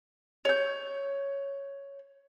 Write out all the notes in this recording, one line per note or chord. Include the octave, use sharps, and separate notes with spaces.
C#5 G6